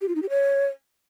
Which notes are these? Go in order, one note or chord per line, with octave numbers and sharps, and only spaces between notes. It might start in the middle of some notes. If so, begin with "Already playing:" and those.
G4
F4
D#4
G4
C#5